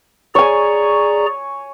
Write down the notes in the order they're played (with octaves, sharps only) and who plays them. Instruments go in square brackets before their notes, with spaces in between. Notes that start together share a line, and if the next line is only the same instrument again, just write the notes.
[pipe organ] G#4 D5 A#5 [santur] C#5 G#5